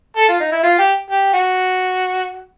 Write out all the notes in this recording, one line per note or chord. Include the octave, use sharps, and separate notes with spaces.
A4
F4
D#4
E4
F4
G4
G4
F#4